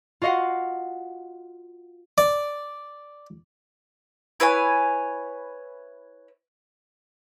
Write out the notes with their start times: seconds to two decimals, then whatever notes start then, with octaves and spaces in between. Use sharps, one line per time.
0.22 F4 F#4 D#5 F5 F#5
2.18 D5
4.40 E4 B4 C#5 G#5